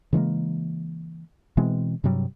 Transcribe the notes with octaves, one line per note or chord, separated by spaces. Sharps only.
C#3 E3 G#3 A#3
B2 E3 G#3 C4
G2 C3 F#3 G3